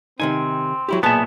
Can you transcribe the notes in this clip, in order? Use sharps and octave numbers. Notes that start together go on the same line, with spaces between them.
C3 D#3 C4 D#4 G#5
F#3 E4 G4
B1 A#2 B3 G#4 E5 A5